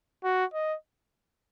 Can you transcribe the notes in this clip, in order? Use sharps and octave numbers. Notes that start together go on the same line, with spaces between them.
F#4
D#5